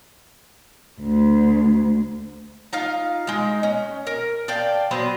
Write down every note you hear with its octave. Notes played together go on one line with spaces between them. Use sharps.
D2
D#4 F4 F5
G#3 D#4
C#4
A#4
D5 F5 G5 A5
F#3 B3 B4 C5